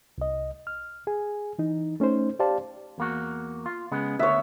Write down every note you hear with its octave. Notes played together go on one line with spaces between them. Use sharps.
C2 D#5
F6
G#4 G#5
E3 D#4
A3 C#4 D#4 C5
G4 C5 D5 F5 A5
E2 A#3 F#4
F4
C#3 G#3 B3
D2 B3 C#5 E5